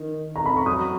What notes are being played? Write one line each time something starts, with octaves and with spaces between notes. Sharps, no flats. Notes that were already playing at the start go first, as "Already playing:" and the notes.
Already playing: D#3
A#5
B5
C#6
F#3 D#6